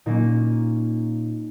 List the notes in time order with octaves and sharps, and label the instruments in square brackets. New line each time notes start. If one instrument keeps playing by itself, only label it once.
[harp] A#2 A#3 C#4 D#4